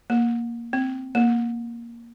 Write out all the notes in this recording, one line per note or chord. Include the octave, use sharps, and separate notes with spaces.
A#3
C4
A#3